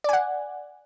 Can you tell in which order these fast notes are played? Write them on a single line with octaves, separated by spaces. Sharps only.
D5 G#5 F#5